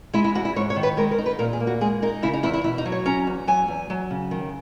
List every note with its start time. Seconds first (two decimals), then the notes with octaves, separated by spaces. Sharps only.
0.13 G#3 E4
0.24 E4
0.35 E2 F#4
0.45 E4
0.56 G#2 C#5
0.70 C#5
0.76 D#3
0.83 B4
0.97 G#3 A#4
1.11 A#4
1.18 D#4
1.26 B4
1.39 A#2 A#4
1.53 G#4
1.60 A#3
1.67 F#4
1.81 G#3 G#4
2.02 D#4 A#4
2.23 C#3 E4
2.33 D#4
2.43 E2 E4
2.54 E4
2.64 B2 E4
2.78 D#4
2.85 F#3
2.92 C#5
3.06 C#4 A#5
3.27 E2
3.47 F#3 G#5
3.68 E2
3.90 F#3
4.11 C#3
4.31 D#3